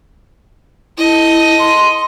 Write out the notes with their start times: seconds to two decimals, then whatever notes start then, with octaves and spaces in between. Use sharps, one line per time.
0.98 E4 A4 D#5
1.59 C6